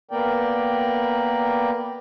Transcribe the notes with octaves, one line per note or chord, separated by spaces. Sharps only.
A#3 B3 A#4 D5 G5